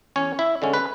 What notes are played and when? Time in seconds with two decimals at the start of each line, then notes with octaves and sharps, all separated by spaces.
0.16 E2 C#4 C#5
0.39 E4 E5
0.62 D3 G#3 C#4
0.73 B4